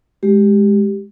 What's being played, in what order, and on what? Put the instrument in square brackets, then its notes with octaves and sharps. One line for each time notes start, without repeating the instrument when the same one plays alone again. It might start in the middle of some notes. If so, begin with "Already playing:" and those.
[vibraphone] G#3 G4